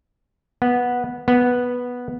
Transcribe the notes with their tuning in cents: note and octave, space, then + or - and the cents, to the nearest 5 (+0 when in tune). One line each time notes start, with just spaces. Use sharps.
B3 -10
B3 -5